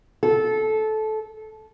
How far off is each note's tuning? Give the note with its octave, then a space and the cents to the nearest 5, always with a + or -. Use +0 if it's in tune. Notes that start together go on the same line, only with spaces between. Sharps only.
A4 -20